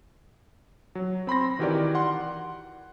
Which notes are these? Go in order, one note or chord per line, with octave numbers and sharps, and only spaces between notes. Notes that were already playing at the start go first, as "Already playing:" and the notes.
F#3
C4 B5 C6 A#6
D#3 E3 F#4 G4 A#4 D5
F#5 C6